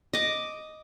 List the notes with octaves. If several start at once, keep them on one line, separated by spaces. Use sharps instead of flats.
D#5 D6